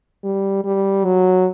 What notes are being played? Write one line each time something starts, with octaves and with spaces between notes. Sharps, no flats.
G3
G3
F#3